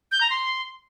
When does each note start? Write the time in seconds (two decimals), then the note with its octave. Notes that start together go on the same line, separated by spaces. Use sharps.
0.12 G6
0.21 A#5
0.30 C6